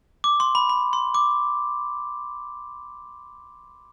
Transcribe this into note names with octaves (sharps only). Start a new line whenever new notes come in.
D6
C6
B5
B5
C6
D6